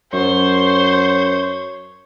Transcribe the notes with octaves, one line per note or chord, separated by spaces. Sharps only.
F#2 C5 C#5